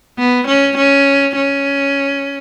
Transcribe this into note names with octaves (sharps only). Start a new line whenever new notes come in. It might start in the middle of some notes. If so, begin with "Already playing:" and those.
B3
C#4
C#4
C#4